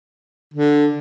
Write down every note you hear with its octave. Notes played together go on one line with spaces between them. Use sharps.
D3